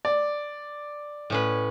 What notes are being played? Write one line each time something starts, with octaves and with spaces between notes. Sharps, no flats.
D5
A2 C#4 B4